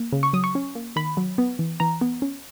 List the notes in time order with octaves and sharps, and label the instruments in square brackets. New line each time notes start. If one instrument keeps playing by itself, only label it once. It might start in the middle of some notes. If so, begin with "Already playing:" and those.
Already playing: [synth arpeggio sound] A#3
C#3
C#6
F#3 D#6
C#6
C#4
A#3
D#3 B5
F#3
B3
E3
E3 A#5
B3
C#4